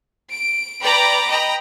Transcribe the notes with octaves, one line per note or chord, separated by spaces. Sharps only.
D7
B4 D5 G5 A#5 B5 D6
D#5 G5 A#5 B5